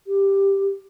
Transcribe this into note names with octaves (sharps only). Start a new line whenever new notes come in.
G4